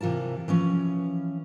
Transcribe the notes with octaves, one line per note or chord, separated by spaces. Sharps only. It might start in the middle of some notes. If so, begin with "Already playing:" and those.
C3 E3 F4 A#4 A5
E3 F3 C#4